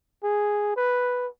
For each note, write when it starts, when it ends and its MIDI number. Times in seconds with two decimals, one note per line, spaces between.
0.23 0.74 68
0.77 1.28 71